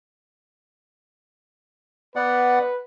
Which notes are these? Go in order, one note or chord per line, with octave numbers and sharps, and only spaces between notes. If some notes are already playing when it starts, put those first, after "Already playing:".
B3 B4 D5 F#5